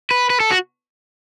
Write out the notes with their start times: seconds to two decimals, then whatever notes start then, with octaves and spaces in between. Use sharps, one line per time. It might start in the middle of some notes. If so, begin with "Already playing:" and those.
0.11 B4
0.30 B4
0.40 A4
0.51 F#4